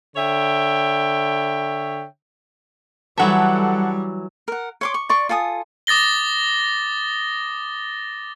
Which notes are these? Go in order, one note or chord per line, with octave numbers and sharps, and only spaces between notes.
D3 C#5 E5 G5
E3 F#3 G3 A4 E5 F#5
A#4 F#5
C#5 C6 D6
C#6
D5 C6 C#6
F4 A4 G#5 D#6
D6 D#6 A6 A#6 G7